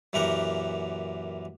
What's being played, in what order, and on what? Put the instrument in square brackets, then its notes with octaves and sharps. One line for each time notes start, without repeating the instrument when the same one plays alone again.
[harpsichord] F#2 A#2 E3 G4 A#4 F#5